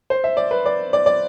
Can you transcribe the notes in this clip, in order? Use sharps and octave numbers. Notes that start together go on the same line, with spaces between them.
C5
E5
D5
B4
D5
D5
D5